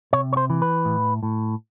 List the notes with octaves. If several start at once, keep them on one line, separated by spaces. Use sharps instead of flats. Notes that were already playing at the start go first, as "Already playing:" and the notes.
C3 C#5
C#5
C5
E3
B4
A2
A2